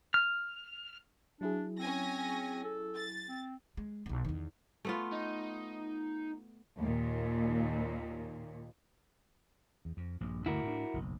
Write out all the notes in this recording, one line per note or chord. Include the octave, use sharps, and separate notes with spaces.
F6
F#3 D4 E4 G#4
C4 C#4 G#5 A#6
A4
A6
C4
G#3
D#1 B1
E2 D#3
A3 B3 F4
D#4
D#2 A#2
E2
F2
A#1 G2
D2 G2 D3 E4 F#4 A#4
A2 D4
F#1 B1 G#2